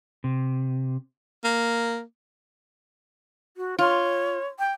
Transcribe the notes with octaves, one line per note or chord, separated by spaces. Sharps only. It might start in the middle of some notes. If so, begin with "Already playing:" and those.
C3
A#3
F#4
F4 C#5
G5